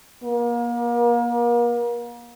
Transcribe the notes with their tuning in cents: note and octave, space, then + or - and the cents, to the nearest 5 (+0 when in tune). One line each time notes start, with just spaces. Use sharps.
A#3 +35